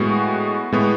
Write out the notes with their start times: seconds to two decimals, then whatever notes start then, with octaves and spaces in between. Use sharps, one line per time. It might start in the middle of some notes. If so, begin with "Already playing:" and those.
Already playing: A2 G#3 B3 F#4
0.72 A2 G#3 B3